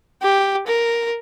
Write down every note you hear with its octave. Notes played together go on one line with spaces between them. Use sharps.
G4
A#4